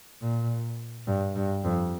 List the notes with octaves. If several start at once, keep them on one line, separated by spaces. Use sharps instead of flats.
A#2
G2
G2
F2